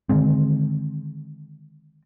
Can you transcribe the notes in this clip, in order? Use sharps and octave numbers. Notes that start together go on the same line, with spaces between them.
D3 D#3 G#3 C4